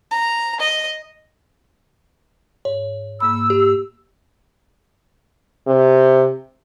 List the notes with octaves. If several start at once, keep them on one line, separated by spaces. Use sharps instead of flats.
A#5
D#5
G#2 C#5
G#2 A#3 B5 E6
G4
C3